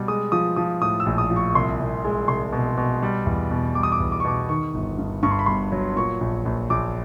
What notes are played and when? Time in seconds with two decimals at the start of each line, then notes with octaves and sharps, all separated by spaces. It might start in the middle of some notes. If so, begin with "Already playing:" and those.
Already playing: B2 G3
0.08 G#3 D#6
0.32 F3 D#6
0.56 F3 D#6
0.81 A2 D#6
1.00 E6
1.06 A#1
1.18 D#6
1.30 F3
1.36 C#6
1.49 C#6
1.55 C2 C6
1.80 C2
2.05 G#3
2.28 C2 C6
2.52 B2
2.77 B2
3.03 G3
3.26 E2
3.51 B2
3.75 G3 D6
3.83 D#6
3.92 D6
4.00 E2
4.12 D6
4.20 C#6
4.25 B2 D6
4.49 D#3 C#6
4.74 G1
4.98 G2
5.23 G2 C#6
5.31 C6
5.39 B5
5.46 G1 C6
5.72 F#3
5.96 A#2 C#6
6.21 A#1
6.45 A#1
6.70 A#1 D6